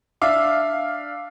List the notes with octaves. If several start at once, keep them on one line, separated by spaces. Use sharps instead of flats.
D4 E5 F5 D6